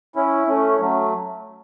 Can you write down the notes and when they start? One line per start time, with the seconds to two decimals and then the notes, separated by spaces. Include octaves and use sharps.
0.16 C#4 E4
0.47 A3 C#4
0.79 F#3 A3